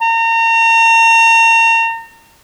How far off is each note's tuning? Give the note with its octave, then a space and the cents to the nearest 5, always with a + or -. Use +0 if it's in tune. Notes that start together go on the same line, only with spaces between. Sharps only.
A#5 -35